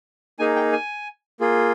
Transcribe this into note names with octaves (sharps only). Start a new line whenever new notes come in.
A#3 D#4 G#4 G#5
G5
G#5
A#3 F4 G#4